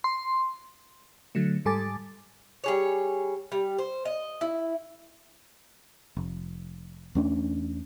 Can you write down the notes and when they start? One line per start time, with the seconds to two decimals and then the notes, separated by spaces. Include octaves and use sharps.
0.04 C6
1.35 D3 F#3 A3
1.65 G#2 G3 A4 G#5 D6 A6
2.64 G3 G#4 C#5
3.52 G3
3.79 C5
4.05 D#5
4.41 E4
6.17 F1
7.15 E2 A3 C#4 D4